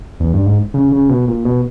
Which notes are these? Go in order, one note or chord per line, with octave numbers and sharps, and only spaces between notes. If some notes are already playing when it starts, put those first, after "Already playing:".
E2
G2
G#2
C#3
C#3
B2
A#2
B2